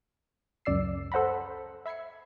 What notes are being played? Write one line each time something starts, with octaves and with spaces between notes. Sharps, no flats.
C#2 F#2 D5 E6 C7
A4 C5 F#5 A#5 B5
E5 B5 G#6 C7 C#7